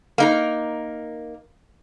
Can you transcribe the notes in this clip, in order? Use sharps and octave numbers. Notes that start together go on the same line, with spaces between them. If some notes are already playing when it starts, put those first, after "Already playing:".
A#3 D#4 A#4